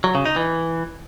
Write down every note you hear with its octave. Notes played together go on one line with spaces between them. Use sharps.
F#3
C#3
D#4
E3